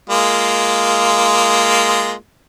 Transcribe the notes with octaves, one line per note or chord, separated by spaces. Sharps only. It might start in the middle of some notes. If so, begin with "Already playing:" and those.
G#3 A#3 F4